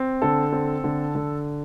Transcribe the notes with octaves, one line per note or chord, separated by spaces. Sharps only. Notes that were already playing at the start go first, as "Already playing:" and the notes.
Already playing: C4
D3 A4
C4
D3
D3